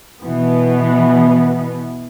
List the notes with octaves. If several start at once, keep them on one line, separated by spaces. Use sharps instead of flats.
B2 E3 B3